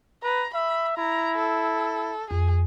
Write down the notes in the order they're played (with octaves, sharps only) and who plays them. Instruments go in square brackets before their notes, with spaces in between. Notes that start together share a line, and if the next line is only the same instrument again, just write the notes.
[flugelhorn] B4 [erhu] A#5
[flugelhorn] E5 [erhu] B5
[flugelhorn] E4 [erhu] A#5
[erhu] A4
[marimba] F2 [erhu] G#4